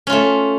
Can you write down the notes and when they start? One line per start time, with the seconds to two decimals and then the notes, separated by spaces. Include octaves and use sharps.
0.07 C#4
0.10 F4
0.12 A3